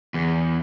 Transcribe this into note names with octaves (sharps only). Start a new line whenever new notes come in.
E2